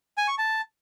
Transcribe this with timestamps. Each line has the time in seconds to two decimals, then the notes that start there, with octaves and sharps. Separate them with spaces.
0.18 G#5
0.28 C#6
0.38 A5